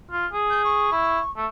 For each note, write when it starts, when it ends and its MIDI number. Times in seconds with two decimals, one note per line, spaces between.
0.11 0.27 65
0.33 0.89 68
0.50 0.62 91
0.65 1.30 85
0.92 1.19 64
1.37 1.47 57